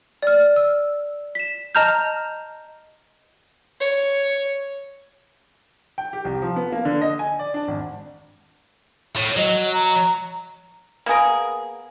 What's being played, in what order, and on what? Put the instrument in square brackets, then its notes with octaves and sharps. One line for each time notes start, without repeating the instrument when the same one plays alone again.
[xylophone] D5 F6
E6
B6 E7
D#5 A5 A#5 F6 G6
[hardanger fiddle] C#5
[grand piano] G5
G4
C2
F3
B3
A#3
D3
D#5
G#5
D5
D4
G#1
[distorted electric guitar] A2
[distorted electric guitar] F#3 [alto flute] D#5
[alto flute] A#5
[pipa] A#3 B3 G#4 A#4